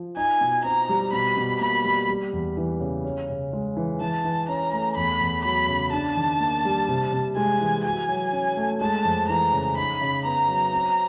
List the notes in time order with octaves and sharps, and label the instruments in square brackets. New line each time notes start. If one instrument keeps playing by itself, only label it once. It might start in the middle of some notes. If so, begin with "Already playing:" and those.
Already playing: [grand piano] F3
[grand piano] D#4 [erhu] G#5
[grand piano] B2
[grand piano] C4 [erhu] A#5
[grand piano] G3
[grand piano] B2 [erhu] B5
[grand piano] B2
[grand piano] A#3 [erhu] B5
[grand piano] G3
G3
E2
E3
C#3
C#4
C#3
G#3
E3
[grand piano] E3 [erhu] A5
[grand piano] E3
[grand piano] C#4 [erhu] A#5
[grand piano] A3
[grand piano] E2 [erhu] B5
[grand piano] E2
[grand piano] F#3 [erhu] B5
[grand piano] C#3
[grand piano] D4 [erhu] A5
[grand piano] D#3
A#3
G3
C3
C3
[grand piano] G#3 [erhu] G#5
[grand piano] E3
[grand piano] F#4 [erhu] G#5
[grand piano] F#3
C#4
A3
[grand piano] G#3 [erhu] A5
[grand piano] F2
[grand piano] E3 [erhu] A#5
[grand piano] C#3
[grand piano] D#4 [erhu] B5
[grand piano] C#3
[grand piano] B3 [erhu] A#5
[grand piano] F#3
C4